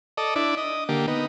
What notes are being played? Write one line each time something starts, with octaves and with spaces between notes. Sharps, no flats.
A4 D5 D#5
D4 E4 D5
D#5
D3 A#3 G4
B3 D#4